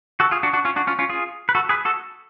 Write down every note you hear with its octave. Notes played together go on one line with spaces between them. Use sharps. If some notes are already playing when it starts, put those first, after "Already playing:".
F#4 A4
F4 G#4
D4 F#4
D4 F#4
C#4 F4
D4 F#4
C#4 F4
C#4 F4
F4 G#4
B4
F#4 A4
G#4 B4
F#4 A4